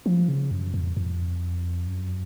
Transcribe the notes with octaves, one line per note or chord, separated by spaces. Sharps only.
F3
C#3
F#2
F2
F2
F#2